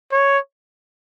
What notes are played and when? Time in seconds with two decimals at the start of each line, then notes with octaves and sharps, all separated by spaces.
0.12 C#5